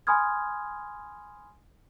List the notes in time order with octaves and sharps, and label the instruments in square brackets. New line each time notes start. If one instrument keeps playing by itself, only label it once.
[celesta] G#5 B5 C6 D#6 F6 G#6